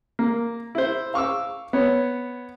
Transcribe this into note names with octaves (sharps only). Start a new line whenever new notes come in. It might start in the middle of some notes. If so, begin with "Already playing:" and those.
A#3
E4 C5
F5 C#6 D6 E6
B3 C#5